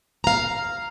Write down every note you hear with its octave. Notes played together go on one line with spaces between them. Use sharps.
F5 A#5